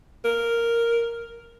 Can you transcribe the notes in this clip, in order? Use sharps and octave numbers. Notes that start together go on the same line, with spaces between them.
A#4